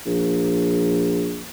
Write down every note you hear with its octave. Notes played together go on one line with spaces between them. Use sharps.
A#1